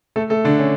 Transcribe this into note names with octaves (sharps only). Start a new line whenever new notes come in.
A3 A4
A3 A4
D3 D4
C#4